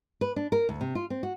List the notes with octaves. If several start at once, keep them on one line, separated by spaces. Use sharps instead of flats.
B4
D4
A#4
D2
C3
F4
C4
F#4